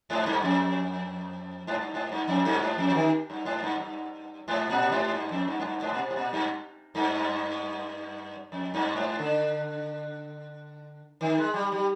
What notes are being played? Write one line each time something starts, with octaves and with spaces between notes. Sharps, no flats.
G#2
G2
F2
G#2
G2
G#2
G2
F2
G2
G#2
F2
F3
D#3
G2
G#2
G2
G2
G#2
A#2
G#2
G2
F2
G2
G#2
G2
G#2
A#2
C3
G#2
A#2
G2
G2
F2
G2
G#2
D3
D#3
G#3
G3
G3